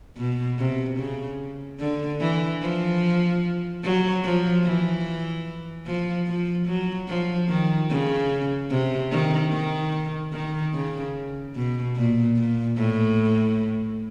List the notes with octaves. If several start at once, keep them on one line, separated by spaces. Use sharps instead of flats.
B2
C3
C#3
D3
E3
F3
F#3
F3
E3
F3
F3
F#3
F3
D#3
C#3
C3
D#3
D#3
D#3
C#3
B2
A#2
A#2
A2